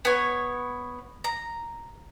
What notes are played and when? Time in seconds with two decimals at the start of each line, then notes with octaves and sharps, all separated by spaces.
0.05 B3 C#5
1.24 A#5